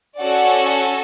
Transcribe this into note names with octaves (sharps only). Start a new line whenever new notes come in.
C#4 F#4 A4 D5 F#5